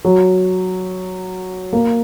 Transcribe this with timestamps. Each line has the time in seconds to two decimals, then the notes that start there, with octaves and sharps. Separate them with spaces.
0.05 F#3
1.73 A#3